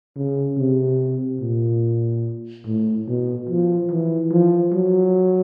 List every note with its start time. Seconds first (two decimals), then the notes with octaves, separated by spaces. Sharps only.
0.16 C#3
0.58 C3
1.41 A#2
2.66 A2
3.07 B2
3.49 F3
3.91 E3
4.32 F3
4.73 F#3